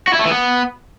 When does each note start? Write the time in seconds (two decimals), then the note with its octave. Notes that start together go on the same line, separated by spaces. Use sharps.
0.08 F#4
0.13 E4
0.19 A3
0.25 E3
0.31 B3